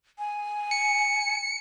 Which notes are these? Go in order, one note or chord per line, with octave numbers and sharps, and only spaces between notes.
G#5
C#7